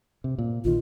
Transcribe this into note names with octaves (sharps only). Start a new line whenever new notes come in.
C3
A#2
A#1 D#3 F4